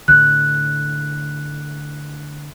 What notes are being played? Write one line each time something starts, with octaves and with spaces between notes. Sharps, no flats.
A2 D3 F#6